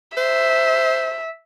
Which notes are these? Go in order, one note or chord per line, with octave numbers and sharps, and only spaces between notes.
C5 E5